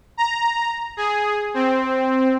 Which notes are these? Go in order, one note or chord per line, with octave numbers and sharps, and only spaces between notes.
A#5
G#4
C4